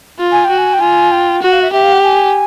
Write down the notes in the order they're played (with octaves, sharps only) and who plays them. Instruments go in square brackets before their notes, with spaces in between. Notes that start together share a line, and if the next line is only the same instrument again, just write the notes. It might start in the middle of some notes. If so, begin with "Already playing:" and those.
[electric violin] F4
[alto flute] G#5
G5
[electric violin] F#4
[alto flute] G#5
G5
[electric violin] F4 [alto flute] G#5
[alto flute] G5
[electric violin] F#4 [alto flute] F#5
[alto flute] F5
E5
[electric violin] G4 [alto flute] E5
[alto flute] F5
F#5
G#5